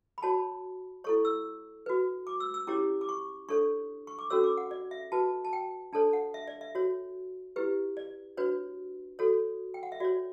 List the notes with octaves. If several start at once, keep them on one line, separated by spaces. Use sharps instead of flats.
B5
F#4 C#5 A5
E4 A4 C#5 C#6
E6
F#4 B4
D6
E6
E6
C#4 E4 G4 C#5 D6
D6
C#6
D4 A4 C#5 C#6
C#6
D6
C#4 F#4 A4 C#5 E6
D6
F#5
D5
E5
F#4 B4 A5
A5
G5
D4 A4 C#5 A5
F#5
E5
D5
E5
F#4 C#5
E4 G4 B4
D5
D4 F#4 B4 C#5
F#4 A4 C#5
G5
F#5
E5
F#4 C#5 D5